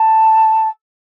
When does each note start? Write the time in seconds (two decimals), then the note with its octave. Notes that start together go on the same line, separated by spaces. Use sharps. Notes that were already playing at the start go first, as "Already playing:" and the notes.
Already playing: A5